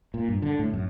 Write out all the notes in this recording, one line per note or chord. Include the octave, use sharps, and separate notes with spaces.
A#2
G2
D3
A2
F#2